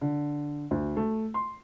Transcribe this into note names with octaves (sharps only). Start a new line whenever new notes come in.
D3
D2
A3
C6